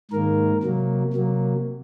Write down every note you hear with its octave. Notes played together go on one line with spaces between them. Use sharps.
G#2 D#3 A#3 A#4
C3 F#3 A#3
C3 F#3 A#3